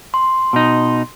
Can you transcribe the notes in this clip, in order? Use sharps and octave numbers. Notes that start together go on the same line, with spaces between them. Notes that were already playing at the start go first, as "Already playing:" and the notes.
C6
B2 D#4